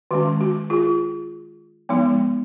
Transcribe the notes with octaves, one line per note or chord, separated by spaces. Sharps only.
D#3 G#3 C#4 F#4
F#4
F4 G#4
F3 G#3 B3 D#4